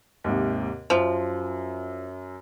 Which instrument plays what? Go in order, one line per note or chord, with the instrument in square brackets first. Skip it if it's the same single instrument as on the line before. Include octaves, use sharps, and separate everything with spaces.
[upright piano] D#2 G#2 C3
[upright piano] F#2 [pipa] F3